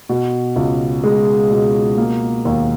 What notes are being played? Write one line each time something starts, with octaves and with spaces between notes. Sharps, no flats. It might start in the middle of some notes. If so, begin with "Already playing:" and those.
B2
C#2
G#3
B2
A#3
D#2